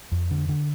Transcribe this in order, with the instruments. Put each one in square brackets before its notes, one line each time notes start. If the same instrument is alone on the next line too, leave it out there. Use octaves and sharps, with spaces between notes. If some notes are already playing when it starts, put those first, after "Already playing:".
[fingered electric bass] F2
D3
D3